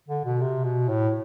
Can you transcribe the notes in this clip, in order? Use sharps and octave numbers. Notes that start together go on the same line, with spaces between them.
D3
B2
C3
B2
A2